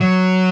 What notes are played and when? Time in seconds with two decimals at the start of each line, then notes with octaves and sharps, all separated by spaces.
0.01 F#3